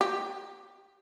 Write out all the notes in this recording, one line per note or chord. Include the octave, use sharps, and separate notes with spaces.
G4